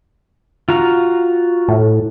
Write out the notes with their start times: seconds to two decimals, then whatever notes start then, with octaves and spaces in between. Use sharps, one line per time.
0.69 F4 F#4 A#5
1.68 A2